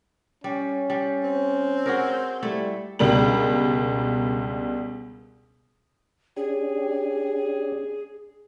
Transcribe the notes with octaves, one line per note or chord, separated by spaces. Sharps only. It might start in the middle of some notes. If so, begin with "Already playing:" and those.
G3 C#4
G3
C4
F#4 G#4 A#4
G3 A3 E4
C#2 B2 G3 D4 A#4 F#7
C#4 D4 G4 G#4